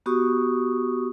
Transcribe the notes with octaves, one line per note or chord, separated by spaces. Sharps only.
B3 F#4 G4 C#6 D#6